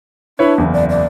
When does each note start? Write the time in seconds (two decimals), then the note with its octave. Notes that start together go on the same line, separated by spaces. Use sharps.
0.39 D4 E4 B4 C#5
0.58 F#1 E2
0.74 D5
0.90 D5